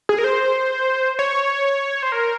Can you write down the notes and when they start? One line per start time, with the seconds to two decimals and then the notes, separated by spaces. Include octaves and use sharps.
0.09 G#4
0.18 A#4
0.24 C5
1.19 C#5
2.03 C5
2.12 A#4